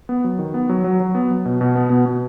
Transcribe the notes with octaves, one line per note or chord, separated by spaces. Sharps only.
B3
F#3
D#3
B3
F#3
F#3
F#3
B3
F#3
B2
B2
B3
B2
B2